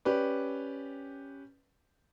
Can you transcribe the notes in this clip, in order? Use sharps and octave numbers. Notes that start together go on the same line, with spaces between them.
C#4 G4 B4 D5